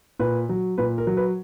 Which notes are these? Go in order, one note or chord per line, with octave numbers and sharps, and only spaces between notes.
A#2 B4
F#3
A#2 B4
A#4
F#3
B4